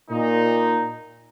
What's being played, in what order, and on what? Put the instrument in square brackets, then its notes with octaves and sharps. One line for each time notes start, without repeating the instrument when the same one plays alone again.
[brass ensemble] A#2 D#4